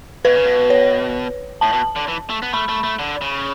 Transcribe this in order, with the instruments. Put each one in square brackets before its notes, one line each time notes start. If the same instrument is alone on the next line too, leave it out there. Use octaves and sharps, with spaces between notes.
[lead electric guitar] B2 [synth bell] B4
[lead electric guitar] C#3
B2
[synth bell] C#5
[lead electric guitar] A2 [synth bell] A5
[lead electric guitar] B2
D3
E3
A3
B3
[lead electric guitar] A3 [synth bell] B5
[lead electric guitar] A3
A3
D3
C#3